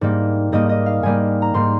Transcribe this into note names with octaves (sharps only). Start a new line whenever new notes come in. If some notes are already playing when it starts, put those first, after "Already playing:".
G#2 G3 A#3
G#2 G3 A#3 D#5
D#5
F5
G#2 G3 A#3 G#5
A#5
G#2 G3 A#3 C6